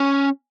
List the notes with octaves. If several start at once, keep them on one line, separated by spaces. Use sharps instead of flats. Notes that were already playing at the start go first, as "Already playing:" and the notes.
Already playing: C#4